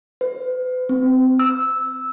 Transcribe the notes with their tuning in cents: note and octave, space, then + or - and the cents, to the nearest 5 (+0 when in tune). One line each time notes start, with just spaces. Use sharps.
B4 +45
C4 -20
E6 -10